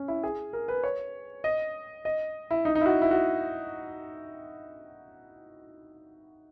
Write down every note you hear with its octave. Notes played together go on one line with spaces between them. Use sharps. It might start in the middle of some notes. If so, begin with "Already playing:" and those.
Already playing: C#4
E4
G#4
A#4
B4
C#5
D#5
D#5
E4
D#4
D#4
E4
F#4
E4
F#4